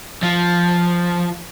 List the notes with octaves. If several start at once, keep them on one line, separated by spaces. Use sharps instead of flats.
F3